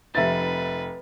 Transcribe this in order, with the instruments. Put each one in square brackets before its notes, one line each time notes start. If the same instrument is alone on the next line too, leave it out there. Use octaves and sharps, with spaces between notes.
[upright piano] F1 E5 A6 [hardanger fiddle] B4